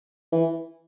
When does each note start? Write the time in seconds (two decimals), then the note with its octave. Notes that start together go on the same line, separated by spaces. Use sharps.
0.32 E3